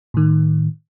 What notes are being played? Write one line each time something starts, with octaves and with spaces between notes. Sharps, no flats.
A2 D#3